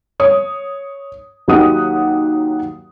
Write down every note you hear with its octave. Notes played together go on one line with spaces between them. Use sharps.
C#5 D#6
D#2 F#3 D#4 G4 F#5 D#6